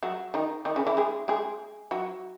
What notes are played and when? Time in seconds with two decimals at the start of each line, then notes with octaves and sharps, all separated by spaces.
0.03 F#3 F#4
0.34 D#3 D#4
0.65 D#3 D#4
0.76 C#3 C#4
0.87 E3 E4
0.97 G#3 G#4
1.28 G#3 G#4
1.91 F#3 F#4